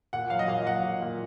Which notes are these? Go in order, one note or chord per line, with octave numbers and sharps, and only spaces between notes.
A#2 F#5
F#3 F5
D#5
A#2 F5
F#3 F#5
A#2
A#2